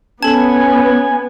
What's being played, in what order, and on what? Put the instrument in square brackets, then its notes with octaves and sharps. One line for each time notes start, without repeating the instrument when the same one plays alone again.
[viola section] B3 [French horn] C#4 [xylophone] A4 A5 [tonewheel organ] G#5